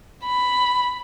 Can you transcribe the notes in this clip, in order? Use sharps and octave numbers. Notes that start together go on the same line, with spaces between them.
B5